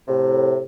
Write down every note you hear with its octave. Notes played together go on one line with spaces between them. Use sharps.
A2 C3